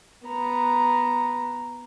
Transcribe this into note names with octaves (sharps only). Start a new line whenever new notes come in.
B3 A#5